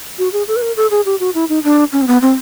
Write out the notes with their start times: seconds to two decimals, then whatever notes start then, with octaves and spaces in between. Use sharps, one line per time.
0.18 F#4
0.33 G#4
0.48 A4
0.56 B4
0.62 A#4
0.77 A4
0.91 G#4
1.05 G4
1.20 F#4
1.35 E4
1.49 D#4
1.64 D4
1.93 C#4
2.02 C4
2.08 B3
2.22 C4